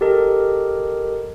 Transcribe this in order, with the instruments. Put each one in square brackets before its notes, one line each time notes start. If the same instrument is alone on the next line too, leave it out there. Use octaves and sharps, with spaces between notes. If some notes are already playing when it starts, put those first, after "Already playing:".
[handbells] G4 A4 A#4 D#5